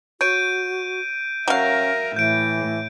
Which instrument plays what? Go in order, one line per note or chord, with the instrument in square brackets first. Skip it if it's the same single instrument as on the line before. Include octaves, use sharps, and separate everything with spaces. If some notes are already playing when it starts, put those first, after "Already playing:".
[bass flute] F#4 [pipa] C#5 [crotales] G6 D7 D#7
[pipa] F#3 F5 [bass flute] C#4 [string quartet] A#4 E5
[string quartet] A2 [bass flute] E3 [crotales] G6 D7